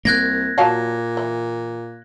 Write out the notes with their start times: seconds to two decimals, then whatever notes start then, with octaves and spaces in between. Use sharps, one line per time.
0.05 C2 A#3 F#6 G#6 A#6
0.58 A#2 F#3 F5 A5
1.17 E3